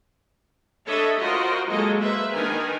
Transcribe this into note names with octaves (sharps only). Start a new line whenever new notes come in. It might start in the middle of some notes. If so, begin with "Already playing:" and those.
D4 A4 C#5 D#5 E5 B5
F4 F#4 A#4 C5 D#5
F#3 G#3 A#3 G#4 A4 D#5
A#3 B4 C5 E5
D#3 D4 D#4 A#4 B4 G#5